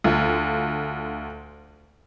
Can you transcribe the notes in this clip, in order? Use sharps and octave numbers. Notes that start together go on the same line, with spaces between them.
D2 F4